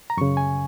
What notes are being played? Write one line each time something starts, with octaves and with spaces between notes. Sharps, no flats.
A#5
F#2 C#3 C#6
G#5